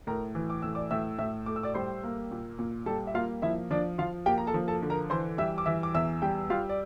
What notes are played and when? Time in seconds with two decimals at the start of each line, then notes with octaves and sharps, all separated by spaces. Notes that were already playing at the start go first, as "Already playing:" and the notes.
0.07 A2 A#4 A#5
0.35 E3
0.50 D6
0.62 A2 E6
0.75 D5 D6
0.91 A2 E5 E6
1.19 A2 E5 E6
1.46 A3 D6
1.56 E6
1.63 D5 D6
1.74 G3 C5 C6
2.03 A#3
2.31 A#2
2.59 A#2
2.86 G3 A4 A5
3.07 E5
3.14 A#3 F4 F5
3.42 F3 E4 E5
3.71 F3 D4 D5
3.98 F3 F4 F5
4.26 A#3 G4 G5
4.38 A#5
4.47 A4 A5
4.54 F3
4.68 A4 A5
4.82 D3
4.90 A#4 A#5
5.10 E3 C5 C6
5.38 G3 E5 E6
5.58 D6
5.66 E3 E5 E6
5.83 D6
5.94 E2 E5 E6
6.22 G3 G4 G5
6.50 G3 F4 F5
6.69 D5